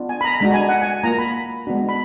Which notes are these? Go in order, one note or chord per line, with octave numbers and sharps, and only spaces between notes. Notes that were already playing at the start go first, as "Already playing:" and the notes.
Already playing: B3 D4 F4
G#5
B5
A#5
G#3 D4 F#4 A#5
G#5
F#5
G#5
A#3 F4 A#5
B5
G#3 B3 D4 F#4
B5